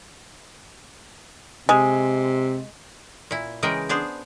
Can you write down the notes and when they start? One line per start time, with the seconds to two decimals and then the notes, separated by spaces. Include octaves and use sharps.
1.69 C3 G#3
3.31 A#2 E4
3.63 C#3 E3 G#3 A#4 D#5 G5
3.89 B3 D4 G#4 C5